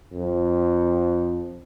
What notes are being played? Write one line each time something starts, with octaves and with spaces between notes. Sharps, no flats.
F2